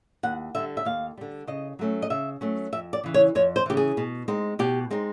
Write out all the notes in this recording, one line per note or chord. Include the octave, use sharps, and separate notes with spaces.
D#2 F#5
D3 G3 E5
E5
D#2 F5
D3 G3
C#3 D#5
F#3 A3 C#4
D#5
C#3 E5
F#3 A3 C#4
F2 E5
D5
C#3 E3
C#5
F2 C#5
C5
C#3 E3 G4
G#4
B2
G#3 C4 D#4
B2 G4
G#3 C4 D#4